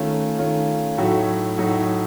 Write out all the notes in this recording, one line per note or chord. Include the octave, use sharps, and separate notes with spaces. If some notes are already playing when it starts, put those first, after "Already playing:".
Already playing: D#3 A3 C#4 F4
D#3 A3 C#4 F4
A2 F#3 A3 D#4 F#4
A2 F#3 A3 D#4 F#4